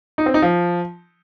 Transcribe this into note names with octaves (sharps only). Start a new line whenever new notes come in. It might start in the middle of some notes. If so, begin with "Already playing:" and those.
D#4
C4
D#4
F3